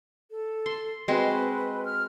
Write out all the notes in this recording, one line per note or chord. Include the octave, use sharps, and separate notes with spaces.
A4
C6
G#3 C4 F#4 B4
F6